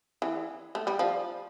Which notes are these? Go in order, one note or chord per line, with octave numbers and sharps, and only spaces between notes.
E3
A3
G3
F3